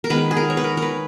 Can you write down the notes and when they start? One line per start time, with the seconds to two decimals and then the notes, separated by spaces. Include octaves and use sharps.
0.04 A#4
0.10 D#3 G#3 B3 B4
0.31 G#4
0.37 A#4
0.50 C#5
0.57 B4
0.64 A#4
0.77 A#4
0.82 B4